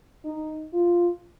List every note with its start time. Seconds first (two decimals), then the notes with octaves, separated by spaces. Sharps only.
0.25 D#4
0.73 F4